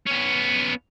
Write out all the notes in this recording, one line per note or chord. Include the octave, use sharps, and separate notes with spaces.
B3 C#4